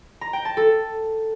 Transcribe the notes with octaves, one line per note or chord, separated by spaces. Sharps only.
A#5
G5
A5
A4